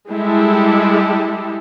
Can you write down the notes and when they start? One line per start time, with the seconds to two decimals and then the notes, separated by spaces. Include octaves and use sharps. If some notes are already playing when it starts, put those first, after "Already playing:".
0.11 G3 G#3 E4 G4 A4